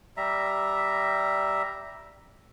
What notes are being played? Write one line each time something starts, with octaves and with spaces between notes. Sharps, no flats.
G3 E5 A#5